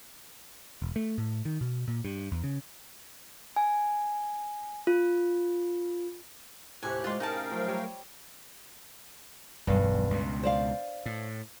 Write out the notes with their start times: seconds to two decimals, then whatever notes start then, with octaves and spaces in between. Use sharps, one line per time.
0.82 E1
0.96 A3
1.18 A2
1.45 D#3
1.61 B2
1.88 A#2
2.04 G2
2.32 E2
2.44 C#3
3.56 G#5
4.87 F4
6.83 D#2 A2 C3 A3 G4 G#5 F#6
7.04 C3 G#3 F4 D5 C6
7.20 C#4 D#4 G#4 A#4 F5 G5 A5
7.51 F3 F#3 A3
7.68 G3 C#5
9.67 E1 B1 G2
10.11 C#2 B2
10.43 C5 D5 F5
11.06 A2